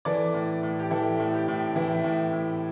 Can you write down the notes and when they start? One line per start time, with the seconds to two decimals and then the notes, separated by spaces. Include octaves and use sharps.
0.05 E3 A4 D5
0.34 A2
0.63 A2
0.80 G4
0.91 E3 E4 A4
1.19 A2
1.34 G4
1.48 A2
1.76 E3 E4
2.04 A2
2.33 A2